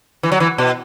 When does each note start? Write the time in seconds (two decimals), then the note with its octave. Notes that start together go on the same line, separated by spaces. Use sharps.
0.23 E3
0.32 F#3
0.40 E3
0.58 B2